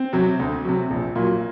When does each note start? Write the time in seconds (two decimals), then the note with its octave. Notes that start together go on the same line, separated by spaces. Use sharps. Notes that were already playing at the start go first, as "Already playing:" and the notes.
Already playing: C4
0.13 C3 F#3
0.39 D2
0.65 C3 F#3
0.90 A#1
1.16 A#2 F#3